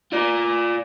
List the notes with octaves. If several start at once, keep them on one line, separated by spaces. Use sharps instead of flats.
F4 D5